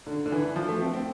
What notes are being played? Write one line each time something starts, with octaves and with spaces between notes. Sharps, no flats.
D3
D3
E3
F3
A3
C4
C4